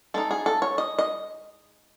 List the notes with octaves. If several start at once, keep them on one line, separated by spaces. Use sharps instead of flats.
G#3 D#4 A4
G#4
A4
C#5
D#5
D#5